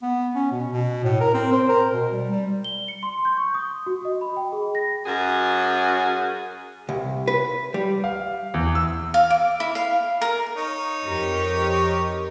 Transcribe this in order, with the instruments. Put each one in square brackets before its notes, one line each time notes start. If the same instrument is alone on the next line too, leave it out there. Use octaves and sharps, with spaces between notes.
[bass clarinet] B3
C#4
B2
B2
A2
A#4
C4
C5
A#4
B2
G3
G3
[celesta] G7
C#7
C6
G6
C#6
D#6
F#4
D#5
B5
G5
G#4
A#6
[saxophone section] F#2 C#4 F#4 G#4
[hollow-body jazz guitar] C2
B4
G3
[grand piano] F5
E2
E6
[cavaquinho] F5
D6
E4
F5
A#4
[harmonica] D#4 C#5
[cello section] F2 G4 A#4